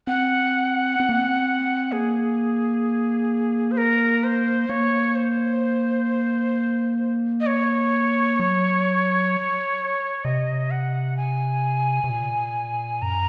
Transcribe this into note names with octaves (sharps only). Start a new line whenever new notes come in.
C4 F#5
C4
A#3
C4
A#3 G#4
C5
A#4
C5
A#3 C#5
C5
D#5
C#5
F#3
C3 D#5
F#5
G#5
C3
A#2
F#2 A#5